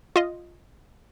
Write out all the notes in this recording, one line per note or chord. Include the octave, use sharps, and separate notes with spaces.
F4 D#5